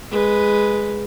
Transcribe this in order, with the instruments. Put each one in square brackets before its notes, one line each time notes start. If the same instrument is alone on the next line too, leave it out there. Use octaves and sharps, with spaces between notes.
[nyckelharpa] G#3 B4